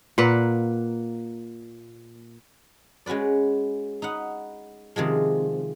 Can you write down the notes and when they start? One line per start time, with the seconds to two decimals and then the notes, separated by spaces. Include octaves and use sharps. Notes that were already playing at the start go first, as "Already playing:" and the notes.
0.18 A#2 A#3 B4 F#5
3.06 G#3 C#4 F#4 B4 D5
4.02 D#4 B4 F#5
4.96 C3 D#3 F3 G#3